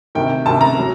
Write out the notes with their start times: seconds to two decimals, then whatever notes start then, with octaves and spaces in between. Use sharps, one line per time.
0.15 D2 C3 D#3 G5
0.46 D2 C3 D#3 A5
0.61 A#5
0.79 F#3